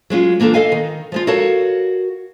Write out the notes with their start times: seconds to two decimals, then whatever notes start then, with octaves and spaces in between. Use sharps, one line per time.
0.10 F#3 G#3 C#4 F4
0.40 E3 A#3 D4 F4 A4
0.54 A4 D#5 F5 G#5
0.72 D#3
1.12 F3 G#3 F4
1.27 F#4 A4 A#4 C#5 F5 A5